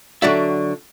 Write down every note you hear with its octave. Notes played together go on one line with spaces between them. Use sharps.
D3 F#3 D4 F#4 D5 E5